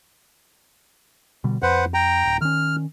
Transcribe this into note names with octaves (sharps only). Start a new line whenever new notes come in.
B2 D3 G3
F2 B4 C5 F#5
G5 A#5
D1
D#3 C#4 F6